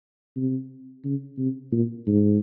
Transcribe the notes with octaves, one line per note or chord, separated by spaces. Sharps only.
C3
C#3
C3
A#2
G#2